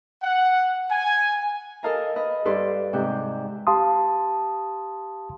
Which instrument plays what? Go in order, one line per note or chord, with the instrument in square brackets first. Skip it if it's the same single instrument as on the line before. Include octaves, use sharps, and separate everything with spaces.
[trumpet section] F#5
G#5
[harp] A4 A#4 D#5 F5 A5 A#5
B4 D#5 B5
G2 A4 B4 D5 C6
G#2 C3 G5 F#6
[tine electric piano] G4 F5 A5 C6 D#6